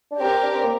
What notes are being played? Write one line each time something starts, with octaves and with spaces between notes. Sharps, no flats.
D4
C4 G4 A#4
D4
C4
A#3